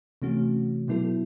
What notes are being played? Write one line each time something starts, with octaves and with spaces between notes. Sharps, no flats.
C3 E3 A3 C#4 F#4
B2 F#3 B3 E4 A4